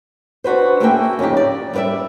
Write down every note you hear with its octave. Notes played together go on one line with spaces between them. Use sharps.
D4 F#4 B4 C5
A3 A#3 F#4 G#4 E5 G5
F2 C#3 C#4 D#4 G4
D5
G3 F4 B4 D5 E5